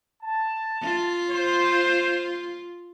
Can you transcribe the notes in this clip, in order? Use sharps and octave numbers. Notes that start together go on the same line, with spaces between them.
A5
F4
C5